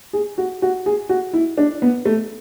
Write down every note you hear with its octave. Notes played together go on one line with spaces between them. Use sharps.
G#4
F#4
F#4
G#4
F#4
E4
D4
B3
A3